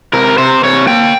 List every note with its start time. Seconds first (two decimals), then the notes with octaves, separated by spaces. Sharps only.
0.13 C3 A#4
0.38 C3 C5
0.63 C3 C#5
0.88 A#3 G5